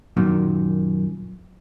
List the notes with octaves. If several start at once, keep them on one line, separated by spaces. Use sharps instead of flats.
F#2 A#2 D#3